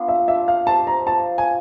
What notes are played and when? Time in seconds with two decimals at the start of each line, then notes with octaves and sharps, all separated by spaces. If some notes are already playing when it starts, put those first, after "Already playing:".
Already playing: B3 D4 F4
0.08 E5
0.28 D4 E5
0.48 F5
0.67 G4 C5 E5 A5
0.87 A#5
1.06 F3 A5
1.38 G#5